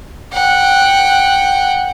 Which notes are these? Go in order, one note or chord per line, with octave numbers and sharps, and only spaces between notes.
F#5 G5